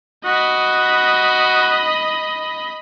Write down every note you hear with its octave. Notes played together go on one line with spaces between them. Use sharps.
F#4 D#5 B5